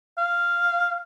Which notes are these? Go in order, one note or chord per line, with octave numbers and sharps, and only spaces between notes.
F5